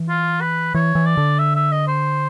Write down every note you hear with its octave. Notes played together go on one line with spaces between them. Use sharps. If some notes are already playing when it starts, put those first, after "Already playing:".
Already playing: E3
F4
B4
E3 C#5
E3
D5
D3
E5
E5
D#5
C5